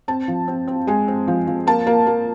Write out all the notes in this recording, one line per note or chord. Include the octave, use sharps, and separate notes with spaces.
C4 A5
F3
C4
C4
G#3 G#5
C4
F3
F3
A#3 A5
A#3
A#3